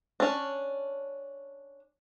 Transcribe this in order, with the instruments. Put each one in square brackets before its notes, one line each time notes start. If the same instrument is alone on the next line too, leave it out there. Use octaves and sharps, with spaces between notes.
[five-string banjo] C#4 D4